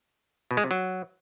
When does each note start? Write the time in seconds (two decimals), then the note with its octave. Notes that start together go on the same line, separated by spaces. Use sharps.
0.51 B2
0.57 G#3
0.64 C3
0.71 F#3